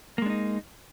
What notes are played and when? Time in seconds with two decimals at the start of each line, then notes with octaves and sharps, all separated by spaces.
0.18 A#3
0.22 G#3
0.26 D4
0.30 D#4